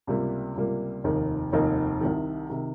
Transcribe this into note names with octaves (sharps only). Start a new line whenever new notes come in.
C#2 C3 G3 A#3
C#2 C3 G3 A#3
F1 D#2 D#3 A#3 D#4
F1 D#2 D#3 A#3 D#4
C2 C3 D#3
C3 D#3